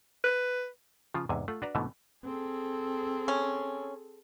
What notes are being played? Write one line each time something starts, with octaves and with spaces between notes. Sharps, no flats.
B4
C#3 F3 F4
E2 G#2 C3 G#5
A3 F4 F#5
D4 F#4 B4 D5 A#5
G#2 B2 D3 E3 A3
C4 G#4 A4
C#4